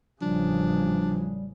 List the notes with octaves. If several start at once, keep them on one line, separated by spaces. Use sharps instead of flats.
A1 C#3 F3 G3 D4